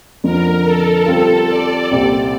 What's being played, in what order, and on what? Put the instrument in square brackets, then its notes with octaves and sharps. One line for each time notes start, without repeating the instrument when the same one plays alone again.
[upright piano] F2 D3 F3 [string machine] A#4
[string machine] A4
[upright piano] G3 C4 F4
[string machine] D5
[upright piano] C2 A#2 G3 C4 G4